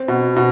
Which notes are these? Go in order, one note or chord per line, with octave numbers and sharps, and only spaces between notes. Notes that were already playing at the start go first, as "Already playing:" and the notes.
Already playing: C4
B2
B2